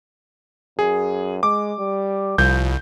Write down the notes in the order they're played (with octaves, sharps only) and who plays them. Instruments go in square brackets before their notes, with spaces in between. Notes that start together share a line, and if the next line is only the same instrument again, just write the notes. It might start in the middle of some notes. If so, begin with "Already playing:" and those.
[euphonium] F#2 [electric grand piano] G#4
[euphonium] G#3 [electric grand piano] D6
[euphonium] G3
[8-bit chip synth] C2 [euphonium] F3 [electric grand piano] G6